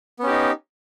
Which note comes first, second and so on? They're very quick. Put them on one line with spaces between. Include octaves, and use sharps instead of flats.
B3 C#4 G4 D#4